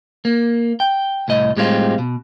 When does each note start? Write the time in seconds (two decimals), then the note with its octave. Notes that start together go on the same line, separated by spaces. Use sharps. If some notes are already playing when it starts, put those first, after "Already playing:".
0.25 A#3
0.80 G5
1.28 C2 A2 D#5
1.57 A2 G3 G#3 C4 F4
1.98 B2